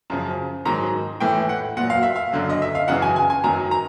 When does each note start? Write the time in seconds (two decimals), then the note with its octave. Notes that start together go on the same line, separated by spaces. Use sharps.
0.10 F#2 C#3 F3
0.65 G#2 D#3 F#3 A#5
1.20 A2 E3 G5
1.49 F#5
1.77 A#2 F#3 F#5
1.90 F5
2.03 E5
2.16 F5
2.33 F#2 D3 F#3
2.50 D#5
2.62 E5
2.75 F5
2.88 F#2 C#3 E3 F#5
3.02 G#5
3.16 G#5
3.30 G#5
3.44 F#2 D#3 F#3 A#5
3.71 A#5